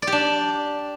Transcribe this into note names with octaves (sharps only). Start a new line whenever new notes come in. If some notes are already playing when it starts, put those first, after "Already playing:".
D5
G4
D4